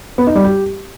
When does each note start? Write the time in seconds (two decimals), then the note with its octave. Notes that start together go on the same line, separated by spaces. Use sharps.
0.18 B3
0.27 D#4
0.35 G3
0.44 G4